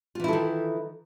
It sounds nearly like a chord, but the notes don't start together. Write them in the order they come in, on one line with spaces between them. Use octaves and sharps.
F4 E3 E4 A4 D#3